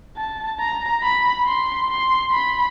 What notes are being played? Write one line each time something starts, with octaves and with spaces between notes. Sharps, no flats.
A5
A#5
B5
C6
C6
B5